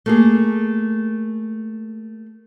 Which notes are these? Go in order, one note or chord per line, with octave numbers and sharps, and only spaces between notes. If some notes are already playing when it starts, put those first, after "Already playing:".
A3 A#3 G#4